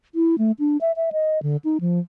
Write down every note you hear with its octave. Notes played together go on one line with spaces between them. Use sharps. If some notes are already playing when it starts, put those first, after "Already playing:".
E4
A3
D4
E5
E5
D#5
D3
D#4
F3